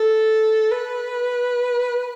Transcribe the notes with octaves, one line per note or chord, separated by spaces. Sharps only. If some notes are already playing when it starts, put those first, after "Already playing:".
Already playing: A4
B4